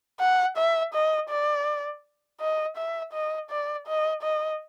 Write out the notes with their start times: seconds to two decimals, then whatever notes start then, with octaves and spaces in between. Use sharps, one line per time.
0.20 F#5
0.57 E5
0.94 D#5
1.29 D5
2.40 D#5
2.77 E5
3.13 D#5
3.50 D5
3.87 D#5
4.23 D#5